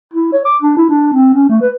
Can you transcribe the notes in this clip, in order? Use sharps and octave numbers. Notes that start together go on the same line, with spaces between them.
E4
C#5
D6
D4
E4
D4
C4
C#4
A3
B4